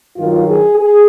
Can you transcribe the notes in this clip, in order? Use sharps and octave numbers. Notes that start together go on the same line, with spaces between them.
G2 D#3 F#3 F4
G#4
G#4